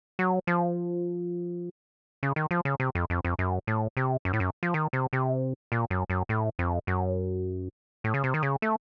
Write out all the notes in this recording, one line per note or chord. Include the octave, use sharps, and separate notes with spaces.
F#3
F3
C#3
D#3
F3
C#3
C3
F2
F2
F2
F#2
A2
C3
F#2
A2
F#2
F3
D#3
C3
C3
A#2
F#2
F#2
A2
F2
F#2
A2
C#3
C3
D#3
C#3
A3